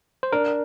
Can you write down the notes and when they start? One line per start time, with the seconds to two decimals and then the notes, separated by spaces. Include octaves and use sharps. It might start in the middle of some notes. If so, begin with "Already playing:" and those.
0.23 C5
0.32 D4 A#4